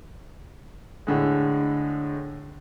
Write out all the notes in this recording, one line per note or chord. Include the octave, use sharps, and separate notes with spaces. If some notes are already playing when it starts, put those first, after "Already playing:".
A2 D3 G#3